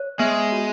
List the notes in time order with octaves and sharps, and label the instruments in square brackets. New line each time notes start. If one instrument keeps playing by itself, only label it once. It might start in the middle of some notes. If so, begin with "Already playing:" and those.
Already playing: [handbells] C#5
[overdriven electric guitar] G#3 [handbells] B3
[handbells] F#4